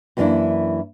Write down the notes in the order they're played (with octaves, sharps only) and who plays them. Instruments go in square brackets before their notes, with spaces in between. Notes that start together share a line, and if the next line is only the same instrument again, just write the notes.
[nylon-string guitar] F#2 E3 A#3 C#4 D4 E4